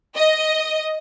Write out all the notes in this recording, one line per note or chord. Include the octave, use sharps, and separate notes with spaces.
D#5